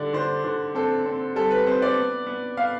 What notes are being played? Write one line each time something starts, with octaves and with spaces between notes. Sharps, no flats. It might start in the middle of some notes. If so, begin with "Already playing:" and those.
Already playing: D3 G3 D5
D3 C5
D3
C4 A4
C4
G3 A4
B4
C4 C5
D5
B3
B3
B3 F5